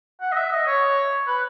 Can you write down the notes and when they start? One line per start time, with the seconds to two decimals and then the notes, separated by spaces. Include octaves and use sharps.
0.21 F#5
0.32 D#5
0.37 E5
0.52 D#5
0.67 C#5
1.27 B4